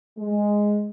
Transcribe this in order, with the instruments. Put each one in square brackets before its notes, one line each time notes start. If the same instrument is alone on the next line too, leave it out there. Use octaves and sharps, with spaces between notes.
[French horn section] G#3